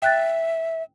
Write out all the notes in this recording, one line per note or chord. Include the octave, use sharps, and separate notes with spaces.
E5 G5 F#6 A6